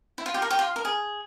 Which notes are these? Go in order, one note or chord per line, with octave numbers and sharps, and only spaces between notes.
E4
F4
G4
A#4
G4
F4
A#4
G#4